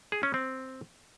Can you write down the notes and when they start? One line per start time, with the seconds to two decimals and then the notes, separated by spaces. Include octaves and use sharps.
0.12 G#4
0.23 C#4
0.34 C4